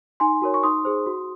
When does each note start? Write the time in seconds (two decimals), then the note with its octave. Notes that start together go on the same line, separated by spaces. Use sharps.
0.20 D#4 G#5 C6
0.42 F#4 A#4 C#5
0.54 C#6
0.63 D#4 C6 D#6
0.85 G#4 C5
1.06 F#4